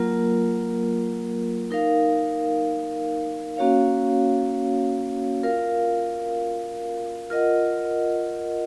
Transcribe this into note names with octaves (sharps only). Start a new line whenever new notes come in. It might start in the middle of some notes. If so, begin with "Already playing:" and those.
Already playing: F#3 A#3 F4 A#4
D#4 A#4 F5
A#3 C#4 F#4 C#5 F5
F4 A#4 F5
F4 A#4 D#5 F#5